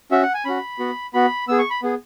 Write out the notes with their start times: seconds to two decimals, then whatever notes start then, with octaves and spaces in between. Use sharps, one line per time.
0.12 C#4 F#4 E5
0.22 F#5
0.34 G#5
0.45 C#4 F#4 B5
0.79 B3 F#4
1.14 B3 F#4 B5
1.48 B3 G#4 E6
1.59 C#6
1.70 B5
1.83 B3 G#4